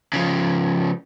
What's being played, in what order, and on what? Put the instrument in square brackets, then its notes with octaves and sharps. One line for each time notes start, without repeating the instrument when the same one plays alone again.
[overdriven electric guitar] C#3 F3